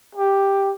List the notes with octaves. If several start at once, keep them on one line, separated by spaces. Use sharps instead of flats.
G4